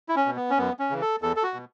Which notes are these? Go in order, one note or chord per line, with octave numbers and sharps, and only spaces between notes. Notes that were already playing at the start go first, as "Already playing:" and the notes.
E4
C#4
B2
B3
C#4
F#2 B3
C#4
C#3 E3
A4
E2 A4
A4
F#4
B2